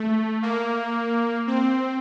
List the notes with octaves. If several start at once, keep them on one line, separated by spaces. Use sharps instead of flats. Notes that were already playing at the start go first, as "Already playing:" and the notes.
Already playing: A3
A#3
C4